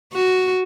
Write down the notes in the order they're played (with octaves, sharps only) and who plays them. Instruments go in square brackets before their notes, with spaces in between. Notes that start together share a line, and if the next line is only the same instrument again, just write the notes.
[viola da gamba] F#4